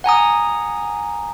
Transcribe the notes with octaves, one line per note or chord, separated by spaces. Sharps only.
F#5 G#5 A#5 D#6